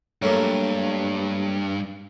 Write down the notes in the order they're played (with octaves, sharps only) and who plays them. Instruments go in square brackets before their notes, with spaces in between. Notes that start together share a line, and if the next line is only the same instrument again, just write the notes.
[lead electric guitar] G2 [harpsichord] F#3 A3 A#3